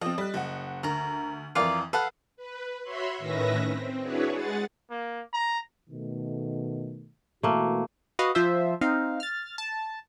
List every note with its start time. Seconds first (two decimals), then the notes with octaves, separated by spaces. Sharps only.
0.01 F3 C4 D#5
0.18 G3 F#6
0.34 F#1 F#5
0.83 D2 A#4 A#5
1.55 F2 E3 F4 A#4 D5
1.93 A4 B4 F5 F#5
2.36 B4
2.83 F#4 C#5 E5 B5 C6
3.18 A2 D#3 C#4 B4 E5 A#6
3.68 C4
4.01 D4 E4 F#4 G#4 B4 C#5
4.34 G#3 G#4 F#5 A6
4.90 A#3
5.33 A#5
5.89 B2 D#3 A3
7.43 B2 E3 A3 A#3 F#4
8.19 F#4 B4 D#5 F5
8.35 F3 F4 C5 E5
8.81 C4 D#4 F5
9.20 F6 A6
9.58 A5